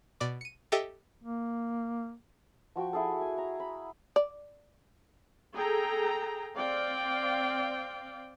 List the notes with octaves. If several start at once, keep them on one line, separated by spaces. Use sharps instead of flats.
B2 D5 D6
C#7 D#7
G4 A4 D#5 E5 G5
A#3
F3 F#4 G5 C#6
E4 G#4 A4
G#5
A#5
B5
D5
G#4 A4 G5 A#5
C4 D5 F5 G5